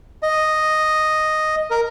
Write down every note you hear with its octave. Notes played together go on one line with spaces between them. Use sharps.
D#5
A#4